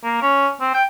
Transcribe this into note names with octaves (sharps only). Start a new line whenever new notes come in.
A#3
C#4
C4
G5